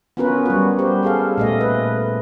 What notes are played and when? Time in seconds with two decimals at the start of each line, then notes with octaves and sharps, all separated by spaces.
0.17 B3 C#4 F4 F#4 A#4 B4
0.46 G3 F#4
0.79 G4 C5
1.03 G#4 A4 F5
1.38 A#2 A3 D#5
1.61 B4